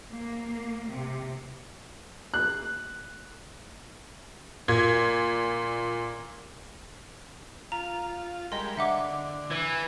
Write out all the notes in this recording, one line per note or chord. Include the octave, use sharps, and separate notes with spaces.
A#3
C3
F#6
A#2 G#6
F4 A#5
G3 G#3 A#4 D#5 C6
D3 E5 F#5 D6
E3